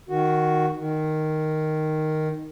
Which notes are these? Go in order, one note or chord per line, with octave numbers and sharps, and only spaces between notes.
D#3 F#4
D#3